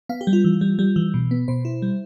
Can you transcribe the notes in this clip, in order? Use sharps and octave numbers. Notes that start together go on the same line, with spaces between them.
B3 F5
G4
G3
F4
E3
G3
G3
E3
B2
B3
B2 C5
E4
G3